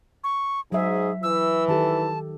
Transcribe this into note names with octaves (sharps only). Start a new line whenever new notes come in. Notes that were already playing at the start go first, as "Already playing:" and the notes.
C#6
G#2 F#3 G#4 E5
E3 E6
D#3 G4 A4 A5